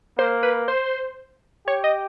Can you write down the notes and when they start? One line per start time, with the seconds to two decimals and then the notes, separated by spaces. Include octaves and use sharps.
0.18 A#3 C5
0.43 B4
0.68 C5
1.67 G4 C#5
1.84 D#5